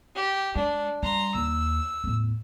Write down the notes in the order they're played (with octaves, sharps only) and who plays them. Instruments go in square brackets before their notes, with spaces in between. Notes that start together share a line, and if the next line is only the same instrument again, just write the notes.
[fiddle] G4
[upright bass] G#3 [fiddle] D4
[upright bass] G3 [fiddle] A#5 C6
[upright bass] D#2 [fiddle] E6
[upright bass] E2 A2